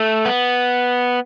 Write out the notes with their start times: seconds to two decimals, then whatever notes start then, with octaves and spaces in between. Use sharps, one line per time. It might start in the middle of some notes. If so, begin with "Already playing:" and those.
Already playing: A3
0.25 B3